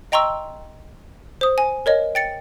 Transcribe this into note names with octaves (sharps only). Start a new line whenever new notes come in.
D#5 G5 A#5 C6 C#6 E6
C5 D#6
G#5
A#4 C#5 D#5
G5 A6 C#7